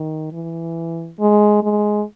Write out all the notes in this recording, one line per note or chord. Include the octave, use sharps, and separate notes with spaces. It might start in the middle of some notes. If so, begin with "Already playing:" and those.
Already playing: D#3
E3
G#3
G#3